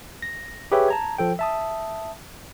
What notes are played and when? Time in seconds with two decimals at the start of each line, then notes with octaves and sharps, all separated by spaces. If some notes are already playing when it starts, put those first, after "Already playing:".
0.22 A#6
0.72 G4 G#4 B4 C#5 E5 G5
0.88 A5 A#5 G#6
1.18 F3 A4 G5
1.39 E5 A5 D#6